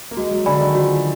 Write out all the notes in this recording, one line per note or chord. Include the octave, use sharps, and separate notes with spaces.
A#3
G#3 F#4
F#3
D3 D5 G#5 B5
D#3
F3 F#4